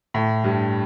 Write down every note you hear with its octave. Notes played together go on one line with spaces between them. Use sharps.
A2
G2